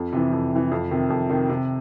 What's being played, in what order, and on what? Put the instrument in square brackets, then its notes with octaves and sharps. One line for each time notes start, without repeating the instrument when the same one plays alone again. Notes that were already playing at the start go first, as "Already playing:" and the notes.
Already playing: [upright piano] F2
C3 E3
F2
C3 E3
F2
C3 D#3
F2
C3 D#3
C3